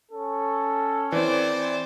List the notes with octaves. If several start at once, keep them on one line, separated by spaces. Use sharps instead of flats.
C#4 A4
E3 C4 C5 D5